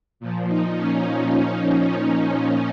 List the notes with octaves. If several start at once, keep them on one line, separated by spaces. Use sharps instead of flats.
A#2 F3
D#4
C#4
D#4
D#4